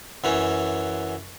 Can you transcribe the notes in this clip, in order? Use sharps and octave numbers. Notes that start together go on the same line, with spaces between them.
F#2 E3 C#4